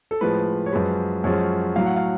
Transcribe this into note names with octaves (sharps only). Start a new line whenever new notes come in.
A4
A2 F3 G#3 B4
C#5
F#2 F3 G#3 B4
F#2 F3 G#3 C#5
A2 F#3 F5
F#5
F5